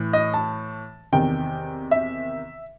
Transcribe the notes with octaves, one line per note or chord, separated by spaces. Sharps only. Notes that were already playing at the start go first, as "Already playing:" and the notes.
Already playing: A2 E3
D#5
A5
E2 C3 D#3 G5
E5